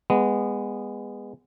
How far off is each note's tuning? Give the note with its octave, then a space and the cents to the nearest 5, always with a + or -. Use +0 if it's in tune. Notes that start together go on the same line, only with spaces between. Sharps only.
G#3 -20 B3 +0